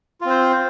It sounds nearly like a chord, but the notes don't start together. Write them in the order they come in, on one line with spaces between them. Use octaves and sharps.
F4 C4 C5